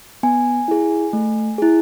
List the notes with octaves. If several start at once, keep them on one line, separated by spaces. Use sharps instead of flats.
B3 G#5
E4 G#4
A3
E4 G#4